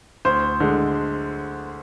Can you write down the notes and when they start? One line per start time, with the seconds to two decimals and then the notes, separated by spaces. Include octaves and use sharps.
0.25 D2 C5
0.60 D3 G#3